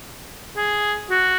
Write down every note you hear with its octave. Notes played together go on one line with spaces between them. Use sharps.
G#4
F#4